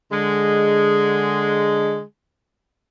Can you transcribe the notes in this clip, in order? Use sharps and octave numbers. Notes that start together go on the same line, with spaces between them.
D3 G#3